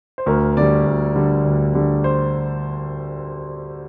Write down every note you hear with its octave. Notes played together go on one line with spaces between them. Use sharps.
C5
D2 A#4
D3 G3 D5
D2
D3 G3
D2
D3 G3
C5